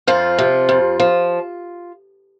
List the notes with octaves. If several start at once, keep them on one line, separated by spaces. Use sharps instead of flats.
F2 F3 F4
C3
F2
F3